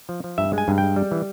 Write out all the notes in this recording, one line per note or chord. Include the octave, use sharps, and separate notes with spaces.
F3
F3
G2 E5
G#3 G#5
G2
G#3 G5
G3
E3